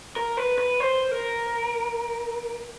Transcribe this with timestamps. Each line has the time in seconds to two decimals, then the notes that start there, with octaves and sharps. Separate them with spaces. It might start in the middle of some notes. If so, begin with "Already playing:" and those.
0.16 A#4
0.37 B4
0.58 B4
0.80 C5
1.12 A#4